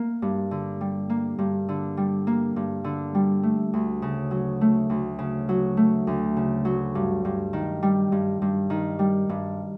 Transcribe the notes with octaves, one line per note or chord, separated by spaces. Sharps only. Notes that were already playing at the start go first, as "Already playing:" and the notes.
Already playing: A#3
G2
D3
G3
A#3
G2
D3
G3
A#3
G2
D3
G3
A3
D2
C#3
F#3
A3
D2
C#3
F#3
A3
D2
C#3
F#3
G2
G2
D#3
G3
G2
G2
D#3
G3
G2